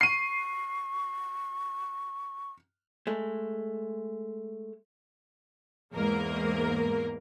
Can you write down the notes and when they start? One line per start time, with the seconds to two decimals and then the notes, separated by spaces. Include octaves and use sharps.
0.01 C#6 C7 D#7
3.07 G#3 A3
5.94 E2 G#2 A#3 A#4